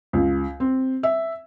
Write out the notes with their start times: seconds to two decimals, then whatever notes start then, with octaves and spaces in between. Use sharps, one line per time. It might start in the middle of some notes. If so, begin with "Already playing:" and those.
0.13 C#2
0.60 C4
1.03 E5